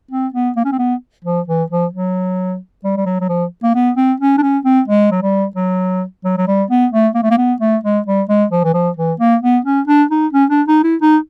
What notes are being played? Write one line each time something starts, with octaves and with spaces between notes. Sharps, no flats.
C4
B3
A#3
C#4
C4
B3
F3
E3
F3
F#3
G3
G3
F#3
F#3
F3
A#3
B3
C4
C#4
D4
C#4
C4
G#3
F#3
G3
F#3
F#3
F#3
G3
B3
A3
A#3
A3
A#3
B3
A3
G#3
G3
G#3
F3
E3
F3
E3
A#3
B3
C#4
D4
D#4
C#4
D4
D#4
E4
D#4